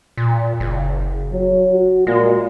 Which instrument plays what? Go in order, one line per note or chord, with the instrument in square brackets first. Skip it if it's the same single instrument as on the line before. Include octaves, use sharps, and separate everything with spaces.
[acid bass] A#2
F#1
[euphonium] F#3
F#4
[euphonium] A#2 [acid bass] G#3